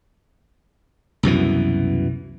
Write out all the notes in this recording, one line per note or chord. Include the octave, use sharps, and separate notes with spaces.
C2 F#2 B2 E3